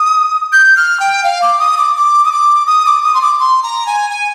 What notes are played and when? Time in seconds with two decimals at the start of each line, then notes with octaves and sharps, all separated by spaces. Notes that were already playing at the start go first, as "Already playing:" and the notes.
Already playing: D#6
0.52 G6
0.76 F6
1.00 G5
1.24 F5
1.42 D6
1.59 D#6
1.78 D6
1.96 D6
2.25 D#6
2.32 D6
2.67 D#6
2.86 D6
3.03 D#6
3.14 C6
3.22 D6
3.39 C6
3.63 A#5
3.87 G#5
4.10 G#5